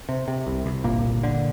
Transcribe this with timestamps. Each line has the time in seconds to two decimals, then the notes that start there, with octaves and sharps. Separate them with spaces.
0.09 C3
0.28 C3
0.47 C2
0.66 C2
0.84 G1 A#2 A#3
1.04 G1
1.23 D3